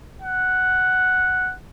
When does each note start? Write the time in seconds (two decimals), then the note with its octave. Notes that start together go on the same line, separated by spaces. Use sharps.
0.22 F#5